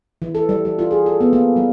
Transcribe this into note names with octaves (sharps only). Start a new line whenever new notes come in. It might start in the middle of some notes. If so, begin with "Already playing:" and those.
E3
A4
G3
G3
F4
G#4
A4
B3
A#3
G3